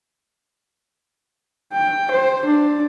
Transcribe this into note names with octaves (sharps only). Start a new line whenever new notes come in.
G5
C5
D4